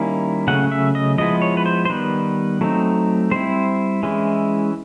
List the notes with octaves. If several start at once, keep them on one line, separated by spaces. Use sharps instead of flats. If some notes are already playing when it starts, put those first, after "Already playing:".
Already playing: D#3 G3 A#3 C#4 E4
C#3 F#3 A3 C#4 F#5
E5
D#5
F3 G#3 B3 E4 D#5
C#5
B4
C5
C5
D#3 G3 B3 B4
F#3 A3 C4 D#4
G3 C4 E4 C5
E3 G#3 C#4 E4